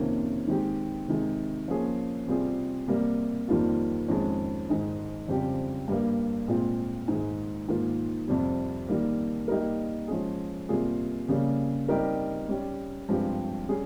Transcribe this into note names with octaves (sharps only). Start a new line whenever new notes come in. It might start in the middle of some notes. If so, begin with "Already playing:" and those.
Already playing: F2 C3 D#3 A#3 C#4
D#3 G#3 C4 G4
C3 D#3 G#3
F3 A#3 C#4 G#4
C3 G3 C4 F4 G#4
C3 G3 A#3
F2 D#3 G3 A#3 F4
F2 D#3 G#3 C#4
G#2 D#3 G#3 D#4
F2 C#3 G3 C4 G4
G2 G3 A#3
A#2 G#3 C4 F4
G#2 D#3 G#3
G#2 D#3 A#3 F4 A#4
F2 C3 G3
D#3 G3 A#3
G3 A#3 D#4 G4 A#4
F3 G#3 C#4 G#4
C3 G3 A#3 F4 G#4
C#3 G3 A#3 C#4
G3 C4 D#4 G4 A#4
G3 C#4 G4
G2 F3 G#3 C4 G4
G3 C#4 G#4